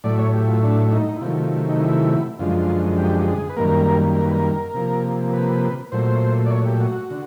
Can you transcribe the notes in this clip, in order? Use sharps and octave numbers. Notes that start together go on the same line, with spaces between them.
A2 F#3 A3 D5
C#5
G4
F4
D4
D#4
E4
C3 D#3 F#3 A3 F4
D#4
E4
F#2 D3 F3 G#3 F4
G4
G4
G#4
B4
F#2 D#3 G3 A#3 A#4
A#4
B4
A#4
C3 F3 A#3
B4
A#2 F#3 A3 C5
D5
C#5
G4
F#4
D3